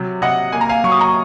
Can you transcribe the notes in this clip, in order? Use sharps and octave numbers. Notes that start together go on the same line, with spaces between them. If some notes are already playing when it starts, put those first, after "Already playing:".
Already playing: C3 F#3
C3 D#5 F#5
A#3 G#5
A#5
F5 G#5
F#3 C#6
D#6
A#5 C#6